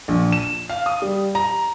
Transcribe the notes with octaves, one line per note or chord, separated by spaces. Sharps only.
A#1
E7
F5
D#6
G3
A#5